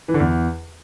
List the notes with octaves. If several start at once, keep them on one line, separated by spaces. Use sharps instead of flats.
E3
D3
E2